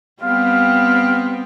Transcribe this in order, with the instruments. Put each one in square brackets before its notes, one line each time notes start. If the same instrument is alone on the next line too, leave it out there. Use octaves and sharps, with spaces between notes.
[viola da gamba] G3 B3 C4 [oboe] F5